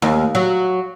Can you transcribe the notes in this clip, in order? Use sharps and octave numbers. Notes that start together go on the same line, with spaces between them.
D#2
F#3